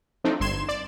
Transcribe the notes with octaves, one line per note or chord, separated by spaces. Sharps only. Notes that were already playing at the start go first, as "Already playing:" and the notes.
F3 A3 C4 D4 D#4
G1 G2 C6 G#6 E7
D5